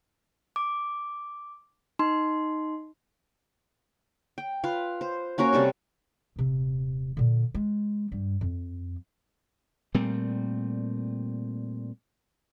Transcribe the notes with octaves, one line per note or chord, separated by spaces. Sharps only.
D6
D#4 C6
G5
F4 B4 F5
C5
A#3 C#4 F#4 A#4
C3 G3 A4 C#6
D#1 C3
A#2 D3
G#3
G2
F2
A#2 G3 A3 C4